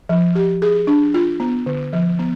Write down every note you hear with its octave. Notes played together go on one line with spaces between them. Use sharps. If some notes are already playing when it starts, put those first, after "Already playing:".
F3
G4
G#4
D4
F4
B3
D3
F3
B3